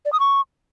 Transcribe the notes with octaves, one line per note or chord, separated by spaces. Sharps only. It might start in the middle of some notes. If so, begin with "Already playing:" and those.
D5
D#6
C#6